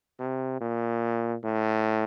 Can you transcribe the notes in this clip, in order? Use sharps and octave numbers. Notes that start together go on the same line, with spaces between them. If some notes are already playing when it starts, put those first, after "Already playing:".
C3
A#2
A2